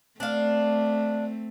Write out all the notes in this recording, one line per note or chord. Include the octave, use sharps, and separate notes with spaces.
A3 C4 D4 F5